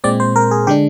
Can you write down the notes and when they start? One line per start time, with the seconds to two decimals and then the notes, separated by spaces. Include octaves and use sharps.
0.04 A#2 G#3 C4 D5
0.20 C5
0.36 A#4
0.51 G#4
0.67 D3 G#3 D4 G4